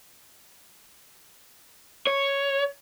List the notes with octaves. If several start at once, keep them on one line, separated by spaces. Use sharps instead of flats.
C#5